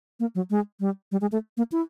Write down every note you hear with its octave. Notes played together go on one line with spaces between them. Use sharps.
A#3
F#3
G#3
G3
G3
G#3
A3
A#3
E4